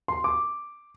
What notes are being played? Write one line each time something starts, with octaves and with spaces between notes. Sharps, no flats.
C6
D6